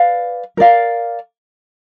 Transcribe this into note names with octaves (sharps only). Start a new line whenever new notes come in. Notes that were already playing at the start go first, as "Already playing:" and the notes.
Already playing: B4 D5 F5
A#4 D5 F5